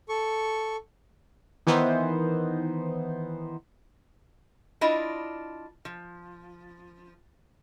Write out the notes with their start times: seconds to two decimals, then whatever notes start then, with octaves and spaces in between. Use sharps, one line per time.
0.09 A4 C#6
1.67 D#3 E3 B3 D#4 C5
4.81 D4 E4 F4 D#5
5.85 F3